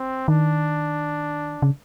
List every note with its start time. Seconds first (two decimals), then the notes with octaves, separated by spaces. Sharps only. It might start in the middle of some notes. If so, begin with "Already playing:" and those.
Already playing: C4
0.28 D#3 D4
1.62 C#3